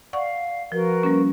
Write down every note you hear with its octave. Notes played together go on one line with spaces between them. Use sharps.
D5 F5 F#5 C#6
F3 F#4 A#4 B4
G3 A#3 C#4